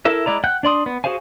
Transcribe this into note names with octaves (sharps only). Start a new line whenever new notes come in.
E4 A4 A#4 E5
G#3 E4 D5 A#5
F#5 G5 F#6 G6
D4 D5 C6 D#6
B3
F#4 G#4 C5 F5 G#5